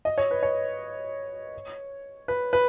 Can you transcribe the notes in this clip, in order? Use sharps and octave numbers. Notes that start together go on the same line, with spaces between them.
D#5
C#5
B4
C#5
B4
B4